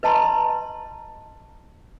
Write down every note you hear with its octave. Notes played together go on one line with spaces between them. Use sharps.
B4 D#5 A5 A#5 C6